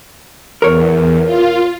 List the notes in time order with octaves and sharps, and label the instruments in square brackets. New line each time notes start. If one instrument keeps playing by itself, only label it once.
[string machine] E2 [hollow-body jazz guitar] A#4 C#5
[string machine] F4